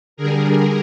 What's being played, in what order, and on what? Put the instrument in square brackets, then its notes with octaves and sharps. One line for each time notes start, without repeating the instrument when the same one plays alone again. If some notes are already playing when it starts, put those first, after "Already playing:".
[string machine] D3 G3 G#4 A#4